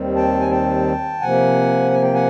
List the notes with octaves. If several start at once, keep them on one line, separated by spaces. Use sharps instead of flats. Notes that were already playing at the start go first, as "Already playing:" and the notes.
Already playing: D#2 D#3 G3 C4
G5 A5
G#5
G5 A5
C3 F3 A#3 F#5 G#5
G#5
G5
F#5 G#5